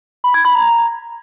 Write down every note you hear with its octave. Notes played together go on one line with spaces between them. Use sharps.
B5
G#6
B5
A#5